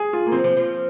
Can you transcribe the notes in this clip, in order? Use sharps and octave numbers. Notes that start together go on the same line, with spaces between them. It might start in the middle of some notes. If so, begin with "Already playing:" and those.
Already playing: G#4
F4
A#3
F3 C4
F3
F3